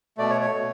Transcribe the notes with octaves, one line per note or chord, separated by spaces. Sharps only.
B2 A3 D5
C#5
C#5
B2 A3